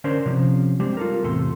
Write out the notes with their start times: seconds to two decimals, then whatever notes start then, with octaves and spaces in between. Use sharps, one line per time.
0.04 D3 C#4 D4 A#4 C5
0.25 C3 F3 C#4
0.80 G3 G#3 C4 D4 G4
0.97 F4 A4 A#4
1.23 E2 A2 C3 A4 C6